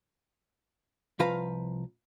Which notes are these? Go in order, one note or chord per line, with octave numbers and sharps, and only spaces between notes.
C2 F3 B4 F5 A#5